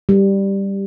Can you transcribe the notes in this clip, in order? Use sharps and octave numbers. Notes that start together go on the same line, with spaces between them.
G3